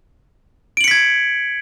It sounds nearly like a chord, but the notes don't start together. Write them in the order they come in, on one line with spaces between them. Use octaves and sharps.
D7 F#7 C#7 B6 G#6